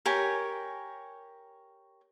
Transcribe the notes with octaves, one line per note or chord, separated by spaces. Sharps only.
G4 A#4 C#5 G#5